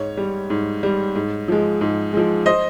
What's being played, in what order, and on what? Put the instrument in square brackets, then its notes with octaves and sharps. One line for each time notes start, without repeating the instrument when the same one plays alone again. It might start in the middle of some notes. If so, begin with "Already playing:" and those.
Already playing: [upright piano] G#2 C#5
G3
G#2
G3
G#2
F3 G#3
G#2
F3 G#3
C5 D#5